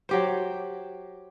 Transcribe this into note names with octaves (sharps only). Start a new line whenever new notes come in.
F#3 G4 C5